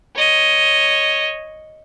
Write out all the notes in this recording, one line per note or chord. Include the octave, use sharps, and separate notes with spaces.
C#5 D#5